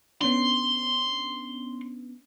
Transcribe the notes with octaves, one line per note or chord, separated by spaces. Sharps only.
B3 C#4 D4 C6